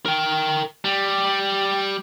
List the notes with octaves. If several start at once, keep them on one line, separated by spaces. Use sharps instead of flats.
A#4 G5
G3